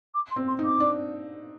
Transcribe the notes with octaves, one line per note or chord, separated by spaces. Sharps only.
D6
C6
C4
C6
D#4
D6
D4